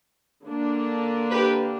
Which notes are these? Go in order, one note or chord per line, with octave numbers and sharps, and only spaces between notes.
D3 A#3 D4
G4 B4